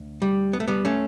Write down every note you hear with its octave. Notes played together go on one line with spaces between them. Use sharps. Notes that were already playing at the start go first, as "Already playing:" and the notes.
Already playing: D2
G3
B3
A3
G3 B3
A3 C#4